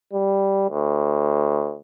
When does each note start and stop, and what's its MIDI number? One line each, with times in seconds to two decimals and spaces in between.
0.13 0.67 55
0.71 1.77 38